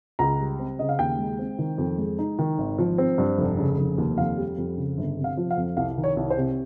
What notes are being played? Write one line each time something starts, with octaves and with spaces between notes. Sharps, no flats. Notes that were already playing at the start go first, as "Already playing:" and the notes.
C#2 A#5
G3
C4
C#3 D#5
F5
D#2 G5
G#3
C4
D#3
F2
G#3
D#4
D#3
G#1
F3
C4
G2
F1
C#3
F1
D#2
F2 F5
G3
F2
C#3
G1
C3
F5
F3
F5
F2
C2 F5
D#3
C#5
C2
C5
C3